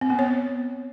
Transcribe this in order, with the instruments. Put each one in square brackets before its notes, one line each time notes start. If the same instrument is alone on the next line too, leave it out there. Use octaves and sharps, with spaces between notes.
[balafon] C4
B3
C#5